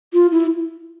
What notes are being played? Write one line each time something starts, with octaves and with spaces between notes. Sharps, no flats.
F4
E4